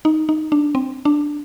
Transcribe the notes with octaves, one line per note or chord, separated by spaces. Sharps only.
D#4
D#4
D4
C4
D4